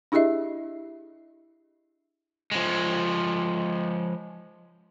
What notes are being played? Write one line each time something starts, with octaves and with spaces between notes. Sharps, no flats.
D4 E4 G4 G#4 D#5 E5
F3 G#3